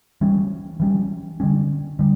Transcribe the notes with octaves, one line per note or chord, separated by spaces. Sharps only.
E3 G3 C#4
E3 G3 C#4
D3 G3 C#4
D3 G3